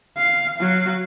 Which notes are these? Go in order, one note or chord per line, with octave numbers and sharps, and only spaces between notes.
F5
F#3 F5